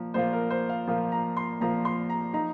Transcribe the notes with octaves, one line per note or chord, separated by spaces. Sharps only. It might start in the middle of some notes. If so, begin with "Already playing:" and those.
Already playing: A#2 F3 A#3
A#2 F3 A#3 F4 C5
A#4
C5
F5
A#2 F3 A#3 F4
A#5
C6
A#2 F3 A#3 F4 A#5
C6
A#5
F3 D#4 A#5